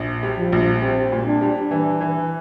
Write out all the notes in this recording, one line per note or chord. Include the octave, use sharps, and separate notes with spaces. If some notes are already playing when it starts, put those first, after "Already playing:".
Already playing: A#1
G3
F3
A#1
G3 C4
A#2
D4
G3
E3 D4
E3